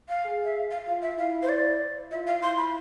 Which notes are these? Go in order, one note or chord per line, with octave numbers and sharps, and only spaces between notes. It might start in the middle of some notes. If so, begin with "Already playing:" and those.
F5
G#4
E5
F5
F5
F4 F5
E5
E4 F5
C5
D5
F4 E5
F5
E4 C6
B5